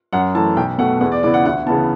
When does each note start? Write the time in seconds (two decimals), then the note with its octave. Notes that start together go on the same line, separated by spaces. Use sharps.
0.13 F#2 F#5
0.34 E3 A3 A5
0.56 B1 G5
0.78 B2 A3 F#5
1.01 E2 F#5
1.12 D5
1.23 C#3 E3 B3 D5
1.34 F#5
1.45 D2 F#5
1.67 C#3 E3 B3 A5